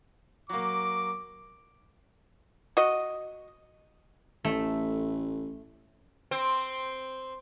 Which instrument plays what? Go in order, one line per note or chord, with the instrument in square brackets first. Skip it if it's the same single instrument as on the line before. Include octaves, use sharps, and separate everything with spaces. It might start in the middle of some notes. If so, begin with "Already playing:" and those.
[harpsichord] F#3 A#3 [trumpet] D6
[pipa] F#4 D#5
[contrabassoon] A1 [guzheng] A3
[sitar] C4